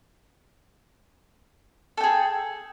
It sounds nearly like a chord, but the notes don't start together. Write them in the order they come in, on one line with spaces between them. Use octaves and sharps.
A4 G5 G#4